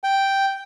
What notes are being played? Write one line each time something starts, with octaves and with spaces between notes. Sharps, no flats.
G5